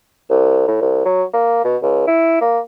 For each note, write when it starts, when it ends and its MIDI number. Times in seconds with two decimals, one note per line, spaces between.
0.30 0.63 36
0.68 0.78 45
0.81 1.04 36
1.06 1.24 54
1.34 1.62 58
1.65 1.77 47
1.83 2.03 37
2.07 2.39 64
2.41 2.59 58